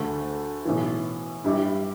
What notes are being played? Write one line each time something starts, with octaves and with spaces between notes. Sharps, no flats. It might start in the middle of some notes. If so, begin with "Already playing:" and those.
Already playing: D2 D3 A3
B1 A2 E3
G2 G3 E4 G4